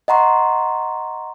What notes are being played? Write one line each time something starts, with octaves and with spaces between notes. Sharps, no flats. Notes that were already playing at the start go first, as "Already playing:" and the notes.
D#5 F#5 A#5 C6 C#6